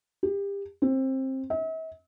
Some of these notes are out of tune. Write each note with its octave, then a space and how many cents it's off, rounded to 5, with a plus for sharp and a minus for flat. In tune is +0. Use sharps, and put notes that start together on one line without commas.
G4 +30
C4 +20
E5 -45